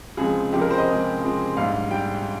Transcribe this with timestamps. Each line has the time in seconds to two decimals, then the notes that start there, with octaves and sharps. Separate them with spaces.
0.17 C#2 C3 F3 G#3 C4 G#4
0.53 C#2 C3 F3 G#3 C4 G4
0.61 A#4
0.70 C5
0.78 D#5
0.88 C#2 C3 F3 G#3 C4
1.21 C#2 C3 F3 G#3 C4
1.57 A#1 G#2 G3 F5
1.90 G3 G5